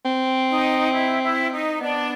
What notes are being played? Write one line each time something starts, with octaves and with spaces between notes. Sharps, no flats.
C4
D#4
E4
E4
D#4
B3 D4